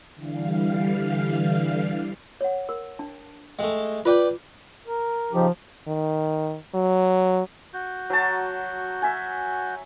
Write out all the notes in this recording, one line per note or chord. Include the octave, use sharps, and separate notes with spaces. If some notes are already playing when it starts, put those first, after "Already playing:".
D3 E3 G3 F5
C#5 F#5
A#4
D4 A5
G#3 A3 G5
F4 B4 D5 G5 D6
A#4
C#3 F3 D#4 G4
D#3
F#3
F#4 G6
F#3 A5
E5 G#5